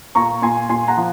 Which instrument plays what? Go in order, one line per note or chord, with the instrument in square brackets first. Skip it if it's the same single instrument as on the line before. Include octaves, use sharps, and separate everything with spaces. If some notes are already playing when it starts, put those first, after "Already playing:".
[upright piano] A#2 A#5 C#6
A#2 G#5 C6
A#2 G#5 C6
F#5 A#5
F3